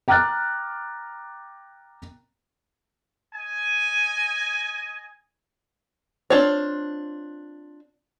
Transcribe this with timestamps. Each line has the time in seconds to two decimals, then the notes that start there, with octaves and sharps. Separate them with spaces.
0.08 G5 A#5 D6 F6 F#6 A6
3.33 D#5 G#5
6.30 C4 D4 F4 C#5